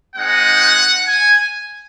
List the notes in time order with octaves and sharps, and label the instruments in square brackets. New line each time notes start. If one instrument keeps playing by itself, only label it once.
[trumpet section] G#3 C4 D#4 F#5
G#5